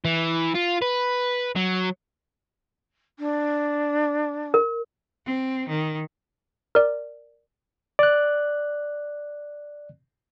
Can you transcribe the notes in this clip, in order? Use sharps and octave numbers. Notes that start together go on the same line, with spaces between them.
E3
F4
B4
F#3
D4
A#4
C4
D#3
A#4 D5
D5 F#6